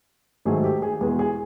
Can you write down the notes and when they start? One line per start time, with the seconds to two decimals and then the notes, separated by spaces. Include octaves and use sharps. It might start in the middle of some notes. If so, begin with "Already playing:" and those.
0.45 G#2 D#3 F#3 A3 G#4
0.64 G4
0.82 G#4
1.01 E2 B2 G#3 G#4
1.19 G#4